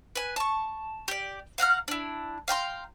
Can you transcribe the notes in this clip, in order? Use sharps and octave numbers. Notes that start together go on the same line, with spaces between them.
B4 G#5
A5 C#6
G4 D5
F5 F#5 A#5 F6
D4 E4
F5 G5 A#5 C6